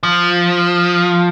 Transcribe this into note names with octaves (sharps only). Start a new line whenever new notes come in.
F3